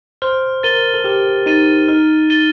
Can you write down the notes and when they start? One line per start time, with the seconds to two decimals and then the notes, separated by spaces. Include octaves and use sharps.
0.22 C5 F6
0.63 A#4 A6 D#7 G7
0.94 A4
1.04 G4 F6
1.46 D#4 A6 D#7 G7
1.88 D#4 F6
2.30 A6 D#7 G7